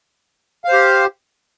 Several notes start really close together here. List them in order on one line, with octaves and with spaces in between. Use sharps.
F5 C5 G4